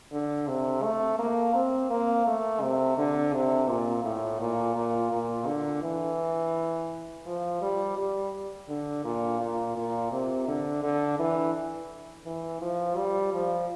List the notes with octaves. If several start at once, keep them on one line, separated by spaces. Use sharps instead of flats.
D3
C3
A3
A#3
C4
A#3
A3
C3
D3
C3
A#2
A2
A#2
A#2
A#2
D3
E3
F3
G3
G3
D3
A#2
A#2
A#2
C3
D3
D3
E3
E3
F3
G3
F3